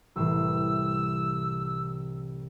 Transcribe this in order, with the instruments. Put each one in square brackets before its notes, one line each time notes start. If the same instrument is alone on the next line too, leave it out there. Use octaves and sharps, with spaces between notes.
[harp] C2 A2 E3 [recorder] E6